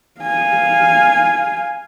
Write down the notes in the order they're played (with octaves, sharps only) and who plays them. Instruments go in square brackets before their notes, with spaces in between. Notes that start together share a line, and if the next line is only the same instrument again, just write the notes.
[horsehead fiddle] F5 G#5